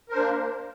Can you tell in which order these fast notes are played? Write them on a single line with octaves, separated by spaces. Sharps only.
A#4 C5 D4 A#3